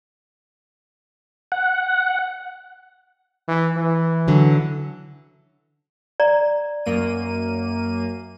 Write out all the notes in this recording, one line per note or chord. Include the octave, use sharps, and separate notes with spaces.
F#5
E3
E3
D3 F#3
D5 A#5
F#2 A#3 D#7